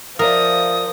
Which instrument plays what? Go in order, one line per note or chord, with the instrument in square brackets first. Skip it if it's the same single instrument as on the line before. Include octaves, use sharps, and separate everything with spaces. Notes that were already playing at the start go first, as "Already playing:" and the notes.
[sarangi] F3 [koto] A#4 [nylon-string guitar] D5 E5 F5 [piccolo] D#6